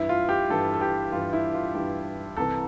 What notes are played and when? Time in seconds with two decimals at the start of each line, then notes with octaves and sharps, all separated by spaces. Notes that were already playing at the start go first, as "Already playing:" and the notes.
Already playing: G2 E3 E4
0.09 F4
0.29 G4
0.50 G2 E3 A4
0.74 A4
0.81 G4
1.12 G2 E3 F4
1.33 E4
1.54 F4
1.74 G2 E3 G4
2.37 C2 C3 E3 A4